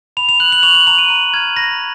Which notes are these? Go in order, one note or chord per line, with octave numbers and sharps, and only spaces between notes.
B5 F7
F7
F#6 F#7
F#7
C#6 F7
F#7
A#5 F7
D#7
A#5
F6 G#6
B5 A#6